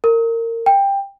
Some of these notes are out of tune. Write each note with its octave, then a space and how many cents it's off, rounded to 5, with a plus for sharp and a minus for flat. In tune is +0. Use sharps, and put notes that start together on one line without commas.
A#4 -25
G5 +15